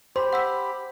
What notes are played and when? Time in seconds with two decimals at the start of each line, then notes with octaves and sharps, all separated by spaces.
0.16 G4 C5 B5 C6
0.33 F#5 E6 B6